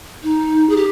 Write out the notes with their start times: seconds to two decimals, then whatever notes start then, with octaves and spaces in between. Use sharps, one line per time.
0.23 D#4
0.69 G#4
0.76 G4